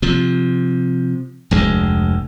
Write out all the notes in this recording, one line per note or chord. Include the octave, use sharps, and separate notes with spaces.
C3 F3
F1 D2 G#3